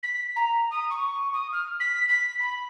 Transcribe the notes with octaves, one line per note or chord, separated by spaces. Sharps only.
B6
A#5
D#6
C#6
D#6
F6
B6
B6
B5